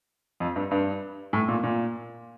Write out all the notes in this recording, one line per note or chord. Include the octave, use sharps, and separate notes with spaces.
F2
G2
G2
A2
A#2
A#2